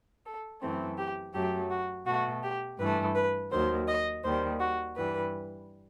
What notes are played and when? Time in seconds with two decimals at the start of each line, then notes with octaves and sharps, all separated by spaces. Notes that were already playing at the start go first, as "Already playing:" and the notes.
0.26 A4
0.62 F#2 E3 A3 C4
0.98 G4
1.34 F#2 F#3 A3 G4
1.70 F#4
2.06 B2 A3 F#4
2.43 G4
2.79 G2 E3 A3 B4
3.15 B4
3.51 D#2 D#3 F#3 C5
3.87 D#5
4.24 D#2 D#3 G3 C5
4.60 F#4
4.96 G2 E3 G3 B4